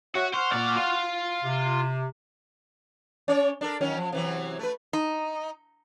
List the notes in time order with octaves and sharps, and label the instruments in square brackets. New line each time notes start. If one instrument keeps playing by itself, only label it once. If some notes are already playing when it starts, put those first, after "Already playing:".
[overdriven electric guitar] F#4 [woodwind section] C#5 E5 F#5
[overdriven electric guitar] C5 [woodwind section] F#5 C#6 F6
[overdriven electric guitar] A#2 D5
F4
[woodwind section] C3
[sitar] C#4 C#5 D5
D4 A4 A#4
D#3 F#3 C#4
F3
C3 E3 F#3
A3 B4
[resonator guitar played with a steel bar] D#4